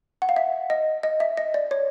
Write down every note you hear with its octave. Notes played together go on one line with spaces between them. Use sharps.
F#5
F5
E5
D#5
D#5
E5
D#5
D5
C#5